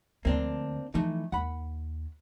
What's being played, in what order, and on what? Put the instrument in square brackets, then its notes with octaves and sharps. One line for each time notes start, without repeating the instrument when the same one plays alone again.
[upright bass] D2 F3 [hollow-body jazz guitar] A#3 C4 D4
[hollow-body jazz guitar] E3 A3 D#4 [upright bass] F3
[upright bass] D#2 [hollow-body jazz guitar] F#5 B5